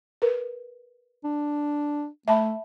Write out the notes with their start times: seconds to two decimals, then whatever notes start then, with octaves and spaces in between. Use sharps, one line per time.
0.22 A#4 B4
1.24 D4
2.28 A3 E5 A5 B5